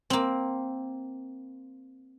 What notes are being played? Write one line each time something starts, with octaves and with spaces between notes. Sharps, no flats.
A#3 C4